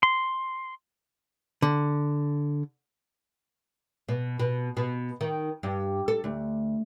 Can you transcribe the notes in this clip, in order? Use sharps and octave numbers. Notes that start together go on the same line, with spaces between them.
C6
D3
B2
B2
B2
D#3
G2
A4
D2